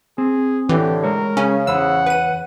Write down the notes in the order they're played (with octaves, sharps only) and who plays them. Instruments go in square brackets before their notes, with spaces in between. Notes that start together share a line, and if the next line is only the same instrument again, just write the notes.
[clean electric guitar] C4 [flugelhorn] G#4
[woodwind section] A2 D3 [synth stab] E3 [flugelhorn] G4
[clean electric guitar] G#3 C#5 [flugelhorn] A#4
[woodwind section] C#3 [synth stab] C#4
[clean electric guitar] E2 C5 B5 [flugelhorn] F#5 [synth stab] E6
[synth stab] B4 D#7